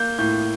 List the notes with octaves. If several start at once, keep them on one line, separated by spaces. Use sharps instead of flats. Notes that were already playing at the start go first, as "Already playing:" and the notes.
Already playing: A#3 G6
A2 G6